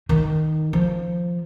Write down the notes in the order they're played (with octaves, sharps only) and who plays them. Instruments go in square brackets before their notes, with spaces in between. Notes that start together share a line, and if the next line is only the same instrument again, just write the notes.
[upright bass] D#3
F3